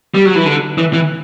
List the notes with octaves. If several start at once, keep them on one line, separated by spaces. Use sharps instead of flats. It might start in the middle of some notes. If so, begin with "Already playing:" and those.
G3
F#3
E3
D3
E3
E3